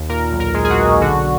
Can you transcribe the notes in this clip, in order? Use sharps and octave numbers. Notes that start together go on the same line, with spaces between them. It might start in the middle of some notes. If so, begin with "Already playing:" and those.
Already playing: D#2
A#2 A#4
B1
A#4
G#3
G#4
F#4
B1
D3 F#4